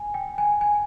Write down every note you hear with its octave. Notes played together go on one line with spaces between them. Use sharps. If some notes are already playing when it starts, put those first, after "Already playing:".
Already playing: G#5
G5
G#5
G#5